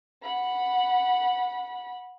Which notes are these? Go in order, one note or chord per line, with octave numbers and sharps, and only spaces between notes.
F#5 B5